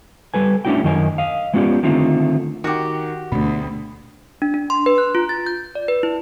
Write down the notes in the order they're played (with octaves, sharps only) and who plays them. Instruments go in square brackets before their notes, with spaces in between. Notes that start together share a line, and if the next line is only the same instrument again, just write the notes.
[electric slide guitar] G3 A4 B4 G#5
A3 C#4 D4 E4 F#4 G5
F#2 D#3 A#4 D#5 G#5
D#5 F5
G#3 B3 C#4 F4 G4 D5
D3 D#3 A3 C4 D#4 F4
[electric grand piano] D#3 [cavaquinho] F#4 G4
[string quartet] D2 [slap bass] B2 A3 [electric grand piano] B5
[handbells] D4
D4
C6
B4
F#6
F4
A6
G6
D5
B4
E4